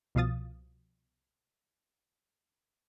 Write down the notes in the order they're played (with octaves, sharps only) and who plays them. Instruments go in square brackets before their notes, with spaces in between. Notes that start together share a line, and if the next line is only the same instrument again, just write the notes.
[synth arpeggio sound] C2 B2 F3 F5 D#6 A6